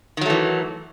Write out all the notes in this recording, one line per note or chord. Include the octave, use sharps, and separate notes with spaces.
D#3 E3 F#3 A3